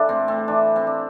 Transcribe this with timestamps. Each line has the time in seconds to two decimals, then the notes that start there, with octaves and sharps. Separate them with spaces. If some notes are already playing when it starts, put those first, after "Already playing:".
Already playing: E3 D4 A4
0.09 A2 C4
0.28 C4
0.48 E3 D4
0.76 C4
0.87 D4